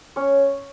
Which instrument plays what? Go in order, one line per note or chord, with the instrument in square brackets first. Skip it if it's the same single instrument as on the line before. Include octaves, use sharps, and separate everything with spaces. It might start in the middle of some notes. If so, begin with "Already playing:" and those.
[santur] C#4 C#5